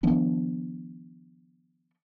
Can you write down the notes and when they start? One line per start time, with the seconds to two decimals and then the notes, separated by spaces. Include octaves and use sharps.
0.03 D#3 F3 B3 D4